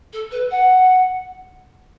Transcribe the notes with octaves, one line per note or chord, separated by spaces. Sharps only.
A4
B4
F#5